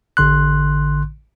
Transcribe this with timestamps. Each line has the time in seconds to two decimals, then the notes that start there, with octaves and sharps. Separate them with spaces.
0.17 A1 D3 C6 F#6